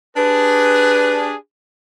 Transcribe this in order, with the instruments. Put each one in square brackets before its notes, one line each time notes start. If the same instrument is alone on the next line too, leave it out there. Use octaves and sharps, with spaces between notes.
[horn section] D4 G4 G#4 [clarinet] B4